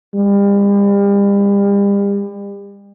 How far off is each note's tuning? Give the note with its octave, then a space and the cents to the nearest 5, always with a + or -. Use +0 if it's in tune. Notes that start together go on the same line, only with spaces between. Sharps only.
G3 +40